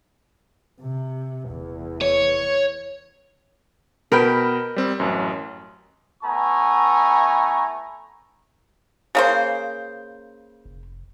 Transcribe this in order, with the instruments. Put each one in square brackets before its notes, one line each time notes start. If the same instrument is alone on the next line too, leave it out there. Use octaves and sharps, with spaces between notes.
[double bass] C3
[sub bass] F1 [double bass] E2
[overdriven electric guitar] C#5
[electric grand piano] B2 [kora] A#4 B4 G5
[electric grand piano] G3 C4
A1 F#2
[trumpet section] A3 B3 E4 G#5 A#5 C#6
[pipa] C#3 A#3 C5
[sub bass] F1